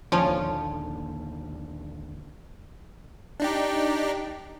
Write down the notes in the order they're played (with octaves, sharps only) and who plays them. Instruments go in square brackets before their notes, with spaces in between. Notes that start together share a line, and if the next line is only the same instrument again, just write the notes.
[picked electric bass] A#1 D#2 D3 [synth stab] F3 C#4 F4 [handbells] A5
[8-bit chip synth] D4 D#4 G4